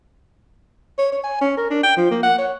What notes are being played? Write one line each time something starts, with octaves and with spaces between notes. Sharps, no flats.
C#5
C#5
G#5
C#4
A#4
D4
G5
F3
A#3
F#5
C#5